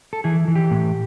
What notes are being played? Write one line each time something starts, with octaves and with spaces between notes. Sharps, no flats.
A4
E3 G#4
E3
G4
A2